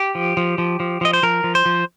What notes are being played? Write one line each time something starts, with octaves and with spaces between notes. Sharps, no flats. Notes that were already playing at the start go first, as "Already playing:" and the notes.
Already playing: G4
F3
F3
F3
F3
F3 D#5
C5
F3 A#4
F3
C5
F3